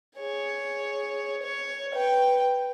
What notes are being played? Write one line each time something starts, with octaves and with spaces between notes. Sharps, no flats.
G#4 C#5
C#5
B4 G5